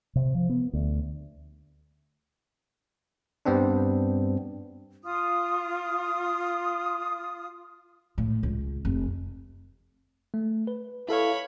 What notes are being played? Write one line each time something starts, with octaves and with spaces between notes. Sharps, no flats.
C3
F3
B3
D2
G2 G3 B3 C4 D4
F4 D#6
A2
C#2
F1
A3
B4
E4 A4 C#5 F5 B5